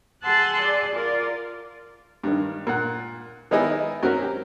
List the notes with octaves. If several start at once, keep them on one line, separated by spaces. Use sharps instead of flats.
G#4 F#5 A5 C6 E6 F#6
G#4 D5
F4 A#4 D5
G2 D#3
A#2 F#5
D#3 B3 D#4 E4 G#4 D#5
F#3 C4 C#4 F#4 A#4
G4